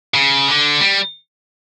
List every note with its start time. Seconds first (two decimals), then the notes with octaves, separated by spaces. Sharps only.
0.15 C#3
0.48 D3
0.81 G3